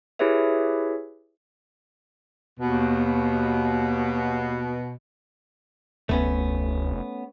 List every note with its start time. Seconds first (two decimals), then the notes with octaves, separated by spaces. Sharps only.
0.19 E4 G4 G#4 B4 C#5 E5
2.59 D#2 B2
6.09 F1 D2 A3 B3 C#4